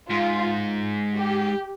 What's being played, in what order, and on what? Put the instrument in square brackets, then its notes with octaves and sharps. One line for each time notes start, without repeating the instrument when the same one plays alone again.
[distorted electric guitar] G#2 [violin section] F4
[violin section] G4